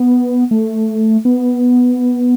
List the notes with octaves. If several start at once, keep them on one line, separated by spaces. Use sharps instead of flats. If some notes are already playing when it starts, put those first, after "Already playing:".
Already playing: B3
A3
B3